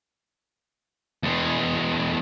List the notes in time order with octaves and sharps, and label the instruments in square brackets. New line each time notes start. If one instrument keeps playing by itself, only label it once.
[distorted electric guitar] E2 G#3